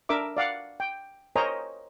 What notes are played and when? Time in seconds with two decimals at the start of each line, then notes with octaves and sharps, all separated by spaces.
0.09 D4 A#4 E5 D6
0.37 D5 F5 F#5
0.80 G5
1.36 A#4 C5 C#5 D#5 G#5 A#5